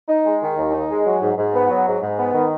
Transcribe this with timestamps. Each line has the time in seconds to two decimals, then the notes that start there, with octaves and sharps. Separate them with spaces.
0.08 D#4
0.25 G#3
0.42 D#3
0.57 D#2
0.73 D#4
0.90 G#3
1.06 F#3
1.22 G#2
1.38 G#2
1.54 B3
1.70 F#3
1.87 G#2
2.02 G#2
2.18 B3
2.34 D#3